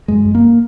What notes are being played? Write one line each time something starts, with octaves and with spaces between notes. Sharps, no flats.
F#2 G#3
F#2
A#3